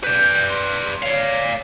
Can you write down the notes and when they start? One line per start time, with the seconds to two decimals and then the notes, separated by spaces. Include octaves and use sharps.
0.03 B4 D5 G6
0.50 C6
1.02 C#5 D5 F5